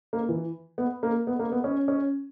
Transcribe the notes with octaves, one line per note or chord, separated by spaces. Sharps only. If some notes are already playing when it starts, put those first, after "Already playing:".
A#3
E3
B3
A#3
B3
A#3
B3
C#4
C#4